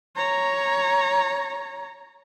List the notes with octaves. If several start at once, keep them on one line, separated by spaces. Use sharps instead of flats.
C#5 A#5